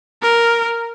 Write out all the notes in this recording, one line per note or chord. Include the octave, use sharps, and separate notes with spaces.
A#4